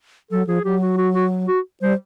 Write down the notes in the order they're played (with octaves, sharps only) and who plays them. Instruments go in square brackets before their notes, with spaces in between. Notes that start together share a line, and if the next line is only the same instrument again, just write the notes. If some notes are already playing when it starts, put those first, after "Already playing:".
[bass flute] F#3 [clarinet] A4
[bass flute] F3 [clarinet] G#4
[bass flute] F#3 [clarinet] G4
[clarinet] F#4
F#4
F#4
F#4
[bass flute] G3 [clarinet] C5